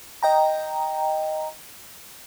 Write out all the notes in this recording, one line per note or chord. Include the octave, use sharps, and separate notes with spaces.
D#5 G5 A#5